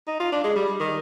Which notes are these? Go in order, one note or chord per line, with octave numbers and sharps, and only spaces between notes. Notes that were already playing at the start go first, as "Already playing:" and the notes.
D#4
F4
D4
G#3
G3
D#3